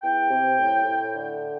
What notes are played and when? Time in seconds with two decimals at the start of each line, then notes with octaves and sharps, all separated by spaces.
0.02 E2 G5
0.30 C3
0.58 A2
0.85 A2
1.14 D3